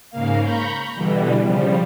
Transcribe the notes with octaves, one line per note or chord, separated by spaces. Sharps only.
G#2 C#3 A#3 F5
A#5 B5 C#6 G6
B2 D3 E3 G3
C#3 F3 G3